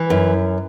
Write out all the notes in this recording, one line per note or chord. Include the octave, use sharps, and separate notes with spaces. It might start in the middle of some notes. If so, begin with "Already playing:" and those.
Already playing: E3
F#2